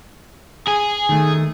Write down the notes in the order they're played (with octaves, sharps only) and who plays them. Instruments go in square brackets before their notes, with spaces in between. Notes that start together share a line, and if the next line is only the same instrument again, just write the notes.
[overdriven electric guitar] G#4
[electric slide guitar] D#3 A3